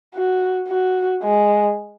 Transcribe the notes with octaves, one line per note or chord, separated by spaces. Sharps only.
F#4
F#4
G#3